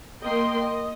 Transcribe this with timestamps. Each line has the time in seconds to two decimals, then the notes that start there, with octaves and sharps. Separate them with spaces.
0.22 A#3 D#5 G5 C6
0.64 D#5